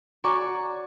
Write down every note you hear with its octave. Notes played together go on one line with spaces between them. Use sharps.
F#4 D5 G#5 A#5 C#6 D6